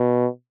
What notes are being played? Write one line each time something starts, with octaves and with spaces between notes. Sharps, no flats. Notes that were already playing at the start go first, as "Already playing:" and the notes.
Already playing: B2